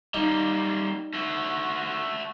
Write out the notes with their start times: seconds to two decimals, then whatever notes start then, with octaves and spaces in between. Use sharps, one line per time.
0.14 G3 A#3 D#4
1.14 A3 F#4